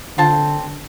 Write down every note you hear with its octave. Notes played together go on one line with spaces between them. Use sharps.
D3 C4 F4 A5